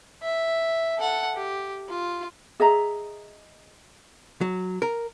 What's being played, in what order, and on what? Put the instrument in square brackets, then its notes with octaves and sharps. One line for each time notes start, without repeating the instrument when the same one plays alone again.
[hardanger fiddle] E5
A4 F#5
G4
F4
[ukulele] G#4 D#5 E5 A#5
[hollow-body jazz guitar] F#3
A#4